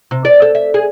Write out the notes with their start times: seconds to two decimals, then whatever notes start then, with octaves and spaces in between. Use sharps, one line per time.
0.11 C3
0.25 D5
0.42 A4
0.55 E5
0.74 G#4